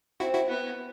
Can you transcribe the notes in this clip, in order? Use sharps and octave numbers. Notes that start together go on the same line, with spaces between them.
C4 E4 F#4
E4 F#4
B3